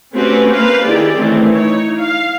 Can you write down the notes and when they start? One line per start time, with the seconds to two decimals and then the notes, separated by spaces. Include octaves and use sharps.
0.14 A3 C4 C#4 F#4 G4 B4
0.52 A#3 B4 C5 F5
0.85 D#3 E4 G4 G#4 D5
1.16 D#3 E3 A3 C4 C#4
1.51 D#4 E4 C#5
2.00 F5